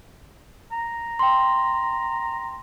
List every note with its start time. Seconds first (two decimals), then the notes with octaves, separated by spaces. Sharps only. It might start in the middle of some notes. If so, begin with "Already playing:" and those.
0.72 A#5
1.19 G5 C6